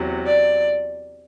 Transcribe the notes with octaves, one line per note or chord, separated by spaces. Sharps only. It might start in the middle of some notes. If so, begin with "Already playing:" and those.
Already playing: E2 C3 F#3
D5